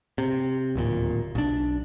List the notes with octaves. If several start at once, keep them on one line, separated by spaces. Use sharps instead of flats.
C3
D1 D#2 A#2
B1 D4